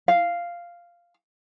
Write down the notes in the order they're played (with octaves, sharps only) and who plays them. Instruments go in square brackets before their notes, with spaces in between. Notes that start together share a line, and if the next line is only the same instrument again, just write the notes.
[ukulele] F5